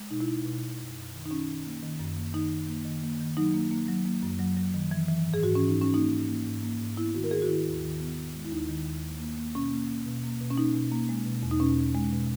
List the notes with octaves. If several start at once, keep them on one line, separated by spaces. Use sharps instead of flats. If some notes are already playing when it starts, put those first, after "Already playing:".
Already playing: G#3
B2 D#4
E4
B2 D#4
B2
B2
F#2
F#2
D#3
D#4
D#3 C#4
D#3
A#3
D#3
F#2
A#3
D#3 D#4
D#3
A#3
D#3
A#3
D#3
F#3 D#4
A#3
A#3
F#3
A#3
F#2
F#3
F#3
D#3
E3
E3
G#2
G#4
G#2 F#4
C#4
E3
D#4
G#2 C#4
A#3 D#4
G#2
A#3
G#2
A#3
G#2
B3 E4
D#3 F#4
A#4
D#3 G#4
F#4
D#3 E4
D#2
D#3
B3
D#3
G#3
E4
D#2 D#4
D#3
D#2
A#3
A#3
A#3
B2 C#4
A#3
A#3
B2
A#3
B2
C#4
A#3 D#4
B2
A#3
G#3
B2
E2
D#4
B2 C#4
E2
G#3
B2